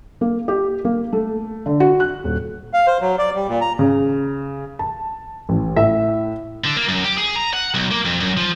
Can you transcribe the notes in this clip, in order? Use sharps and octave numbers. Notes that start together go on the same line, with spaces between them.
A#3
G4
A#3
A3
D3
F#4
F#6
D#1
F5
C5
F#3
D5
G3
A#2
A#5
C#3
A5
A1
A2 E5
D3
A#3
F#2
G4
G#4
A#5
F#5
B1
A#3
F2
F#2
F3